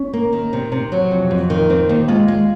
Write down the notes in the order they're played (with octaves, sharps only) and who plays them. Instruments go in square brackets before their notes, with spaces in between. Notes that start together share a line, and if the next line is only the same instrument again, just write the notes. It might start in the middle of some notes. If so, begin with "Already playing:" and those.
Already playing: [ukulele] C#4
[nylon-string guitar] A#3
D#3
C3
C3
F#3
F2
F2
D#3
C4
D#2
[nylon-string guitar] G#3 [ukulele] F4
[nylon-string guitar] G#3